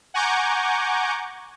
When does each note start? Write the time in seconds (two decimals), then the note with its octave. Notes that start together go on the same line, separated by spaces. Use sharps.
0.14 F#5 G#5 A#5 C#6 D6 G6